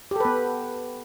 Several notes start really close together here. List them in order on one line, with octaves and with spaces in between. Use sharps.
G4 A4 B4 B3